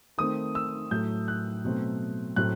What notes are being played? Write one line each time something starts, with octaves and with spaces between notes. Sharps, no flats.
D#3 A3 C4 D#6
E6
A2 F#3 A3 G6
F#6
B2 F#3 A3 C4
A2 F#3 A3 C4 F#6